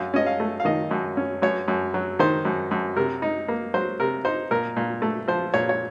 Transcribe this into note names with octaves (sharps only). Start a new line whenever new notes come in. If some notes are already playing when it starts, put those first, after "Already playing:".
Already playing: F#2 F5
C#4 D#5
F5
A3
F5
D#3 D#5
F#2
C#4
F#2 C#5
F#2
F#3
D#3 C5
F#2
F#2
C3 A#4
D#4
A#3
F#3 C5
C3 A#4
D#4 C5
A#2 A#4
A#2
A3
F3 C5
A#2 C#5
C#5